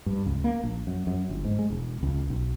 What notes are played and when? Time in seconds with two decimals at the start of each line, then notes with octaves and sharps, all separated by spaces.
0.06 G2
0.26 C#2
0.44 A#3
0.63 A#1
0.87 F#2
1.07 F#2
1.29 G1
1.45 G#2
1.59 G#3
1.70 E1
2.03 C#2
2.30 B1